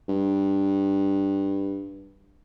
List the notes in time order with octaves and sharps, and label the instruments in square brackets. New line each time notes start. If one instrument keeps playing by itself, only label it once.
[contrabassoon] G2